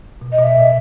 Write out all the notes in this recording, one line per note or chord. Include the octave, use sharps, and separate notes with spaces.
B2
D#5
B2 E5
A#2